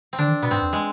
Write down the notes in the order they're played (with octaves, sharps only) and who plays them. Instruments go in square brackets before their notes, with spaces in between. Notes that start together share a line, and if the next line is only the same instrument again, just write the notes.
[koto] C4
[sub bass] D3 [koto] D4
[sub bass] D#3
[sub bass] B2 [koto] B3
[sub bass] G#2 [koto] C4
[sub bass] F2
[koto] G#3